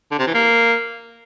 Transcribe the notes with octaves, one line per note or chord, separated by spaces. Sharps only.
D3
C3
E3
A#3